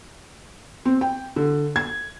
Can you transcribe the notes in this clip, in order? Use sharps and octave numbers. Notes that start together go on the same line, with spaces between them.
C4
G5
D3
G#6